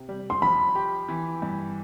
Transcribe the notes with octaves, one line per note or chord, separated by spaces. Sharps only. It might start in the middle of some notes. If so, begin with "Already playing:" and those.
Already playing: C3
G3
C6
F3 B5
G4
E3
G2